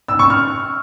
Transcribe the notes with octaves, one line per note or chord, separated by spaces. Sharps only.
E6
C#6
F6